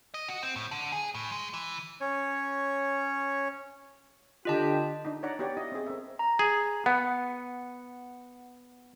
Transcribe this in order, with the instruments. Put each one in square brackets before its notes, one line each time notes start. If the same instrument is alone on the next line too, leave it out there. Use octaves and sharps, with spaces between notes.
[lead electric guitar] D#5
F#4
C4
A2
D3
G#4
A2
G#3
E3
[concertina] C#4 C#5
[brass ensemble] D3 G4 [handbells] F4 D#5 A5
[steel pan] D4 D#4
C#5 D5 F#5 A#5
B3 F#4 G4 C#5 D5
E4 D#5
C4 G#4
C4 A4 A#4 E5
[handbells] A#5
[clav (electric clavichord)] G#4
[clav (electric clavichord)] B3 [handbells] F#5